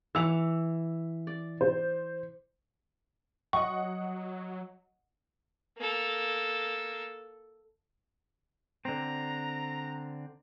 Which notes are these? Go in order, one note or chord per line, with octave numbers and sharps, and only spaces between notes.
E3 F#5 D6 E6 F7
D5
C5
F#3 D#5 F#5 C#6
A#3 A4
D3 C4 A#5